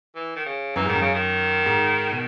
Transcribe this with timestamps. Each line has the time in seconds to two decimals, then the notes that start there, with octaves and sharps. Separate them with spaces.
0.15 E3
0.36 D#3
0.45 C#3
0.76 F#2 E3
0.85 G#2 D#3
0.95 F#2
1.01 C#3
1.14 D#3
1.66 G#2
2.11 B2